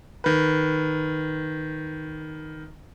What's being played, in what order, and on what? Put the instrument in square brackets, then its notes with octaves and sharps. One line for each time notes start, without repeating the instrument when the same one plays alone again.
[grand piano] D#3 B4